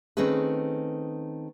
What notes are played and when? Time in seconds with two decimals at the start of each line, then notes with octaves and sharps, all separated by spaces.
0.17 D#3 A3 C4 C#4 G#4 B4